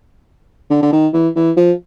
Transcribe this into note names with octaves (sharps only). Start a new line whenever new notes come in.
D3
D3
D#3
E3
E3
F3